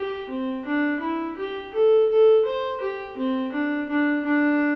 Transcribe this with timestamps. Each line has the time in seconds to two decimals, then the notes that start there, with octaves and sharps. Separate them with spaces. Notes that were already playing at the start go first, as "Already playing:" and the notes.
Already playing: G4
0.29 C4
0.65 D4
1.00 E4
1.37 G4
1.73 A4
2.09 A4
2.45 C5
2.81 G4
3.17 C4
3.52 D4
3.89 D4
4.25 D4